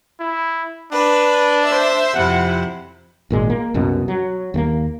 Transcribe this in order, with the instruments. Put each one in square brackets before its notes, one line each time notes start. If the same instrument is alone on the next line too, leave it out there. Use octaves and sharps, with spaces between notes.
[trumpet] E4
[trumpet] D4 [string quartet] B4
[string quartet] C5 E5
[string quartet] F2 C3 E4 [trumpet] F#5
[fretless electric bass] G#1 A#2 G#3
A#3
C2 F#2 B2
F#3
D#2 A3 A#3